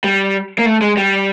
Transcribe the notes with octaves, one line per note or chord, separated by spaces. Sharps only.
G3
A#3
A3
G#3
G3